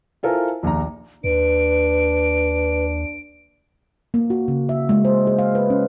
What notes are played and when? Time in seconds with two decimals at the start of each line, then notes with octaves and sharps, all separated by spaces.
0.23 E4 F4 A4 A#4 C5 G#5
0.63 A#1 D#2 D#3 A#5
1.24 D#2 D4 B4 D7
4.14 A#3
4.30 F#4
4.48 C#3
4.69 E5
4.89 G#3
5.05 C5
5.27 G#4
5.39 F5
5.55 B4
5.70 C#4